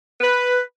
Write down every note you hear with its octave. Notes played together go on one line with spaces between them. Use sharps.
B4